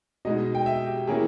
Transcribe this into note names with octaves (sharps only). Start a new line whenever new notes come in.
B2 G#3 D#4 D#5
G5
E5
G4
E3 A#3 C#4 E4 G#4